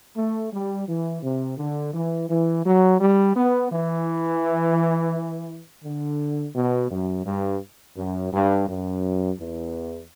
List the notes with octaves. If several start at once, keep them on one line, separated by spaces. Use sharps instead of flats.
A3
G3
E3
C3
D3
E3
E3
F#3
G3
B3
E3
D3
B2
F#2
G2
F#2
G2
F#2
E2